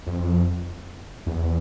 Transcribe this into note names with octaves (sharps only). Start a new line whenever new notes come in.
F2
E2